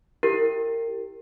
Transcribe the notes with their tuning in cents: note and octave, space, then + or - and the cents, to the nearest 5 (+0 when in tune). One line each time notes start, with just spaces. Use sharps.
E4 +5 G4 +0 A#4 -25